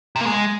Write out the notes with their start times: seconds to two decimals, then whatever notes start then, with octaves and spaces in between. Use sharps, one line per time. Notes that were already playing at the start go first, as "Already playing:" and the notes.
0.16 C3
0.21 A#3
0.26 G#3